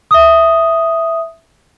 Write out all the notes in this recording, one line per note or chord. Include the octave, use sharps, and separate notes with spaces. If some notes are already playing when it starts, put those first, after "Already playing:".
E5 D#6